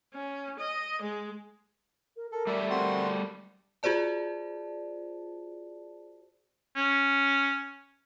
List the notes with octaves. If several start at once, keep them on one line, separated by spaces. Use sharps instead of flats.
C#4
D#5
G#3
A#4
A4 A#4
G3 A3 D5 E5
C4 F#4 A#4 C6
F4 F#4 G#4 C5 D5 A5
C#4